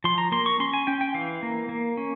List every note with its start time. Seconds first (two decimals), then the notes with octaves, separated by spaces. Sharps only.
0.04 F3 C6
0.18 A#5
0.32 A#3 C6
0.46 C#6
0.60 C#4 C6
0.74 G#5
0.87 C#4 G5
1.01 G5
1.14 E3 F5
1.43 A#3
1.69 A#3
1.97 C#4